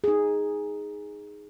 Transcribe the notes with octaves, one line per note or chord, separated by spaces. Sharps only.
D#4 G#4